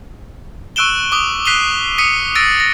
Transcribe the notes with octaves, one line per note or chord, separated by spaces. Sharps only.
C#6 E6 F#6 D7 E7 G7
D6 D#6 G7
F#6 B6 C7 D#7 F7 G7
D#6 B6 C#7 D#7
E6 A6 A#6 D7 D#7
A#6